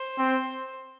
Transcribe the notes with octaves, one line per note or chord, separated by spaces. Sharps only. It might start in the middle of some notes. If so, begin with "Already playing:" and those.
Already playing: C5
C4